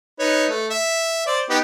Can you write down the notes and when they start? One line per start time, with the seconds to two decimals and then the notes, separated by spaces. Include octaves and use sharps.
0.19 D#4 B4 C#5
0.49 A3
0.70 E5
1.26 C5 D5
1.49 B3 D#4 G4